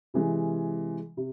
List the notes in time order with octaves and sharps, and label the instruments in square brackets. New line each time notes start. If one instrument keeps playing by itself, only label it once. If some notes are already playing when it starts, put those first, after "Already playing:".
[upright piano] C3 E3 G#3
C3